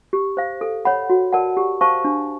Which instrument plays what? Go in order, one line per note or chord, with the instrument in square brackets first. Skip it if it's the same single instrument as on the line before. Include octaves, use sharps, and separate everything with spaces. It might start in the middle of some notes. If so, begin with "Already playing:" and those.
[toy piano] G4
C5 F5
A4
C#5 F#5 B5
F#4
A#4 D5 F#5 A5
G4
C5 F5 A5 C#6
D4